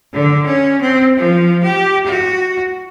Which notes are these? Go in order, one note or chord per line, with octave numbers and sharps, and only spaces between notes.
D3
C#4
C4
F3
G4
F#4